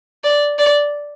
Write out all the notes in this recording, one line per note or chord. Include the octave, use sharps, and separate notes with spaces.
D5
D5